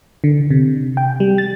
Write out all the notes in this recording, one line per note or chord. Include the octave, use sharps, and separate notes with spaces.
D3
C3
G5
G3
A6